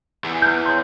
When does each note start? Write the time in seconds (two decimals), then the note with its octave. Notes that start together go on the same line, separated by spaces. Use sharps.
0.24 E2
0.42 B3 F6 G6
0.66 G#4 C#5 C6